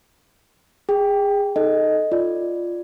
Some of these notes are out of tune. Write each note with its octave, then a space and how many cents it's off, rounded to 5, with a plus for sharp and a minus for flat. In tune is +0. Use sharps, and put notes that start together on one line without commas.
G#4 -25 G5 +0
D#4 +0 A4 +0 D#5 +0
F4 +0 D5 +0